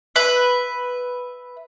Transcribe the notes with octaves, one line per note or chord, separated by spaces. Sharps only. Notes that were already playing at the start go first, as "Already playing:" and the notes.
B4 E5